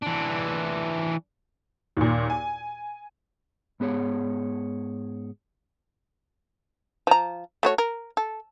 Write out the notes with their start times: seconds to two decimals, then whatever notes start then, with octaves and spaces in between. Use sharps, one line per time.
0.03 E3 D4
1.97 D#2 A#2
2.30 G#5
3.80 G#2 B3 G#4 C#5
7.07 F3 A#5
7.63 A3 F#4 C#5
7.78 A#4
8.17 A4